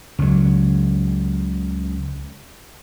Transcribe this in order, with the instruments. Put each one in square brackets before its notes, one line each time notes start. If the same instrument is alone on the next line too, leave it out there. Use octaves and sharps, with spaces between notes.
[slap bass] C#2 F#3